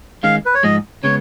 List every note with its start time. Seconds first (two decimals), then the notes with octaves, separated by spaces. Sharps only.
0.23 D#3 G#3 C#4 F5
0.46 B4
0.55 C#5
0.63 G#2 F3 G#3 D#5
1.03 C#3 G#3 B3 C#5